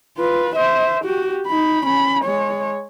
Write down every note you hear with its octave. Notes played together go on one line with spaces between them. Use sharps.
F4 B4
C5 E5
F#4 G4
D#4 B5
C#4 B5
G#3 C#5